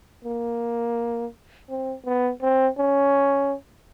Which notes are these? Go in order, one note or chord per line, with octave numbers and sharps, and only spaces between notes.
A#3
C4
B3
C4
C#4